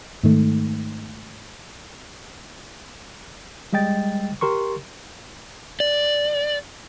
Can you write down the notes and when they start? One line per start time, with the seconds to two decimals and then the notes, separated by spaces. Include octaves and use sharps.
0.23 G#2 D#3 A3
3.73 G3 G#3 D#5 G5 A6
4.41 G4 A#4 C6 C#6
5.80 D5